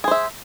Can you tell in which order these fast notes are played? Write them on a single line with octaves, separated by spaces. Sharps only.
G#4 C5 E5